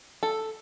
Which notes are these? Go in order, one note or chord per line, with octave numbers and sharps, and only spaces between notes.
A4